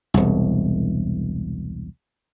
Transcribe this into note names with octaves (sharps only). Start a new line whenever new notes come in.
E1 C2